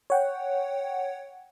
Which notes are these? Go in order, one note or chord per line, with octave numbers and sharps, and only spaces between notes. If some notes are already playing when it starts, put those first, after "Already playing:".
C#5 F#5 G5